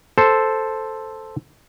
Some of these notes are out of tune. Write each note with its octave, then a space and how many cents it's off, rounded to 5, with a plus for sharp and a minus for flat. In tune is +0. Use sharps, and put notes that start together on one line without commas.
A4 +0 C5 +0